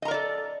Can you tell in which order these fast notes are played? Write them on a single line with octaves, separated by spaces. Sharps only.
D#5 A#5 A#4 D5 A4